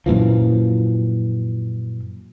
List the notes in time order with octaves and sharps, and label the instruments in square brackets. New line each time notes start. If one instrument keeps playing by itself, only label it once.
[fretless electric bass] F#2 A#2 E3 F3